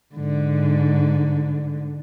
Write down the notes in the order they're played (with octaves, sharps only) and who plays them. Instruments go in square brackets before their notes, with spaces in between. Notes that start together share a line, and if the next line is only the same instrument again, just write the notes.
[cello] G#2 D3